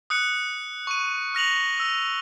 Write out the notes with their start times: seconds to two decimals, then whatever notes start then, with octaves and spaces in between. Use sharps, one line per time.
0.10 D#6 F#6 C#7
0.87 C#6 D#7
1.35 F6 A#6 F7 F#7
1.80 E6